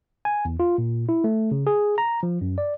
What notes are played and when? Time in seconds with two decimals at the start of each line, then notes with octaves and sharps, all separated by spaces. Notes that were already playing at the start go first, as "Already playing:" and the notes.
0.25 G#5
0.45 E2
0.60 F4
0.78 A#2
1.09 E4
1.24 A3
1.51 C#3
1.67 G#4
1.98 A#5
2.23 F3
2.41 F#2
2.58 D5